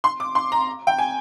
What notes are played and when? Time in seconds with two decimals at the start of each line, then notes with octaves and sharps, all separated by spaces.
0.04 C6
0.20 D6
0.35 C6
0.52 A#5
0.87 G5
0.98 G#5